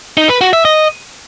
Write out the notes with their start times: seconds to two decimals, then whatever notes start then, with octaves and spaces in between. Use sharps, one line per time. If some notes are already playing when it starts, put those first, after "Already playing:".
0.17 D#4
0.29 B4
0.41 F#4
0.53 E5
0.65 D#5